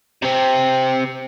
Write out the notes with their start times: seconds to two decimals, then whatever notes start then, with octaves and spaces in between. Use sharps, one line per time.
0.22 C3 C4